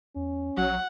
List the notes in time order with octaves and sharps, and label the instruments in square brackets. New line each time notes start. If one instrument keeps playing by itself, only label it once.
[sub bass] E2 [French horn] C#4
[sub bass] A#1 [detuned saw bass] F#3 [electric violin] F#5